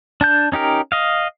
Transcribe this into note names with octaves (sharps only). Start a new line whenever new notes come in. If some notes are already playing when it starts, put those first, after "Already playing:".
D4 A5 G6
C#4 D#4 G4 A#4
D#5 F5